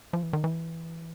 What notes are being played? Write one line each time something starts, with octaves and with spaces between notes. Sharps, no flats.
F3
E3
D#3
E3